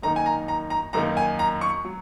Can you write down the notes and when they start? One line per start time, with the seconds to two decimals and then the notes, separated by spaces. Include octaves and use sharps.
0.03 F#2 D#3 A#3 D#4 A#5
0.16 G#5
0.26 A#5
0.48 A#5
0.70 A#5
0.93 F#2 D#3 A#3 D#4 A#5
1.17 G#5
1.39 A#5
1.61 C#6
1.85 F#3